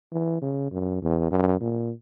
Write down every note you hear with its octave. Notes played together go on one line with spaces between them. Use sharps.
E3
C#3
F#2
E2
F#2
A#2